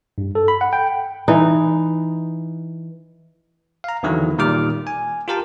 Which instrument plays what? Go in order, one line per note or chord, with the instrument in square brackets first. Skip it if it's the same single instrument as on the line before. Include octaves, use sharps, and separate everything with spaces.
[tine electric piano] G2
A4
B5
F#5
G5
[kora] E3 D#4
[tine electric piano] F5 A#5
E2 D3 D#3 F#3 E4
A#2 D#3 G3 D6 F6
G#5
F4 G4 A#4 G5 A5